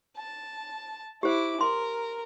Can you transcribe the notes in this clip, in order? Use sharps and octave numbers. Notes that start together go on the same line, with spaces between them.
A5
E4 G4 C5 D6
A#4 C6